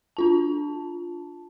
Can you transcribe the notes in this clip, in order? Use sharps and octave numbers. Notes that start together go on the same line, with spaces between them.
D4 F4 A5